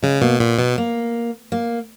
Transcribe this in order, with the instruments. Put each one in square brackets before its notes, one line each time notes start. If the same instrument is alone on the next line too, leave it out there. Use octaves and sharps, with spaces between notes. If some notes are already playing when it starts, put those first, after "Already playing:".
[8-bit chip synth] C#3 [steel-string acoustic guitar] G#3
[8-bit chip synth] B2 [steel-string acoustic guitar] A#3
[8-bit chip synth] A#2 [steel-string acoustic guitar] B3
[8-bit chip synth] B2 [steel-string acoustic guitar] B3
[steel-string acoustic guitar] A#3
A#3